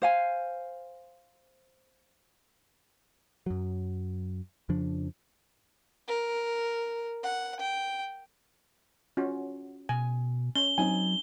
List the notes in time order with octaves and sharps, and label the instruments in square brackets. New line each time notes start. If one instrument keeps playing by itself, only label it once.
[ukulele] C5 F5 G#5
[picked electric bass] F#2 F#3
F2 C#3 F3 D4
[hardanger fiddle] A#4
F#5
G5
[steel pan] C#4 F4 F#4
[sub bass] B2 [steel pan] G#5
[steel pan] C#4 [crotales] G7
[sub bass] F#3 [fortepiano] C4 D#4 G#5